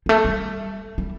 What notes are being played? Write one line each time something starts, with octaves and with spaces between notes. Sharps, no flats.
G3
A3
G3
G3